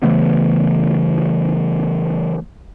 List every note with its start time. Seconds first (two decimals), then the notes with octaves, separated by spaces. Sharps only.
0.03 C#3 E3 A3 B3